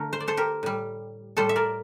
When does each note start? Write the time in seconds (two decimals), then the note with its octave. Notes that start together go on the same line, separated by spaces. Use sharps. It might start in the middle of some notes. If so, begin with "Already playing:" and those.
Already playing: D3 A3 A#4
0.13 C5
0.20 D5
0.28 A4 C5
0.37 G4 A#4
0.63 A2 G3
1.37 A2 G3 A4 C5
1.49 E5
1.56 A#4 D5